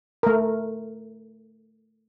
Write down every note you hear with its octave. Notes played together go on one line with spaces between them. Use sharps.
A3 A#4